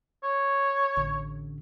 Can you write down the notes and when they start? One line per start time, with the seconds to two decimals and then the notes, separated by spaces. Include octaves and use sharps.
0.24 C#5
0.96 A1 D3